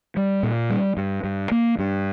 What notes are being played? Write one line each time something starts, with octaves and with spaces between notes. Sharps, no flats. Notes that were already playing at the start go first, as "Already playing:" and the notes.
G3
A#2
G3
G2
G2
A#3
G2